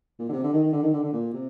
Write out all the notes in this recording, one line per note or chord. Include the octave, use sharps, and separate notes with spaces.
A#2
D3
C3
D3
D#3
D#3
D3
D#3
D3
D3
A#2
C3